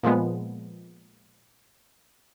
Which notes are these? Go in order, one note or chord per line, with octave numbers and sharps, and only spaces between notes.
A#2 F3 G#3 B3